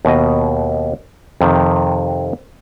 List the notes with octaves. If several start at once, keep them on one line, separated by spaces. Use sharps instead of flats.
D#2 B2 D#5
F2 C3 D#3